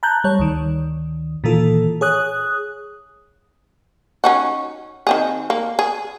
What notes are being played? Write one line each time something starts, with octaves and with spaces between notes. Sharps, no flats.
A5 A#5 F#6 G6
G3 C#5
D2 D#3
A#2 D#3 E3 F4 A4
G#4 C#5 D#6 F#6
C#4 D#4 F#4
D#3 C4 G#4
A#3
G#4